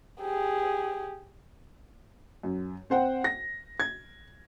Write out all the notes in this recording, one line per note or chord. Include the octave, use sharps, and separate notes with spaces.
G4 G#4
F#2
C4 C5 F#5 G5
A#6
G#6